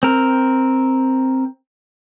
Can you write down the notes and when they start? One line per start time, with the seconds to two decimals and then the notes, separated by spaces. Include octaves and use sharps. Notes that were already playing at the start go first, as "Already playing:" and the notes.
0.03 C4 A#4